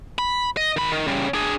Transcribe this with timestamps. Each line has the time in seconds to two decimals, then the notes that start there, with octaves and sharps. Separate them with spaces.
0.19 B5
0.57 D#5
0.77 D#3 B5
0.92 D#3
1.07 C#3 G3
1.34 D4 G#4